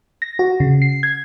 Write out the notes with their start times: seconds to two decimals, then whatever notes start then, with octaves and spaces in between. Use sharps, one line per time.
0.22 A#6
0.39 F#4
0.60 C#3
0.82 C7
1.03 G#6